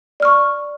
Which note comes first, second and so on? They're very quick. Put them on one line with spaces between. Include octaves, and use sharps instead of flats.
D5 F6 C#6